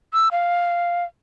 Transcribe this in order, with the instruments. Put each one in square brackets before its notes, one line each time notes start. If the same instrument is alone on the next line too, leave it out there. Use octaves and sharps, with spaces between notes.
[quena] E6
F5